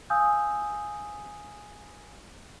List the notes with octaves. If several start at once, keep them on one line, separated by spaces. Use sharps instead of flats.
F5 G#5 D#6 E6 G6